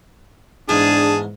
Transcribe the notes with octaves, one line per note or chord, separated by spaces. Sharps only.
E2 G#2 D4 G#4 A5